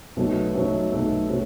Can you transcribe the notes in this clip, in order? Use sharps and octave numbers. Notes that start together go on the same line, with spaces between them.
B1 B2 F#3 A3
B1 B2 F#3 A3
B1 B2 F#3 A3
B2 F#3 A3